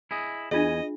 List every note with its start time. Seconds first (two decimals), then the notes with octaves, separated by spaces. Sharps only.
0.11 E4 G#4 D#5
0.51 E2 D4 F4 G#4 D#5 E5 G#5